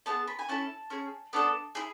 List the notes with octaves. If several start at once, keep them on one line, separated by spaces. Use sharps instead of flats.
B3 E4 G#4 A5
B5
G#5
C#4 E4 A4 A5
C#4 G#4
B3 D4 A4
E4 G#4